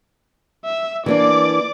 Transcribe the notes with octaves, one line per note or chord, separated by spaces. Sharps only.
E5
E3 A#3 D4 D5 D6